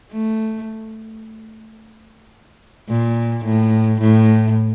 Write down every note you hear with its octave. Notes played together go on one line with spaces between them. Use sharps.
A3
A#2
A2
A2